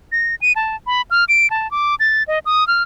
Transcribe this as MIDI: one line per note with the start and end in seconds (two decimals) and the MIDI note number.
0.12 0.35 94
0.42 0.53 99
0.56 0.76 81
0.87 1.02 83
1.11 1.24 89
1.29 1.50 98
1.50 1.70 81
1.71 1.95 86
2.00 2.23 93
2.28 2.39 75
2.46 2.67 87
2.68 2.83 89